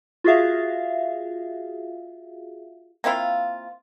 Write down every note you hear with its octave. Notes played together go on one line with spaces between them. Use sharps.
F4 F#4 G#4 E5 F5
A#3 C4 E4 F4